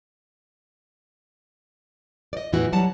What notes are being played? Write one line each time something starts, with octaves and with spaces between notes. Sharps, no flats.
D5 D#5
E2 A2 E3 E4 F#4
F#3 G3 F#5 A5